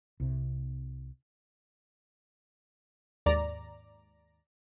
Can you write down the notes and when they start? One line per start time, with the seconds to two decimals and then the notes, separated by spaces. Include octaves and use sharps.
0.20 C2 C3
3.26 D#2 G#2 D5 A#5